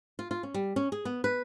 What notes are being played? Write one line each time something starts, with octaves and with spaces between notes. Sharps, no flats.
F4
F4
C#4
G3
C#4
G#4
B3
B4